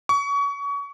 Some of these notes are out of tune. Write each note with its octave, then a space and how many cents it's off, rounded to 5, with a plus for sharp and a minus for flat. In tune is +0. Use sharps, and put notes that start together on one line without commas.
C#6 +30